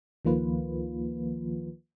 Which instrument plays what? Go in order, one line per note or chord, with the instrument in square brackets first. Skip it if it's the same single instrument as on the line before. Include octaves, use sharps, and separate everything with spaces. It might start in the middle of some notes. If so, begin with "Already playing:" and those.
[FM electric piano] C#2 D#3 F3 A#3 F4 B4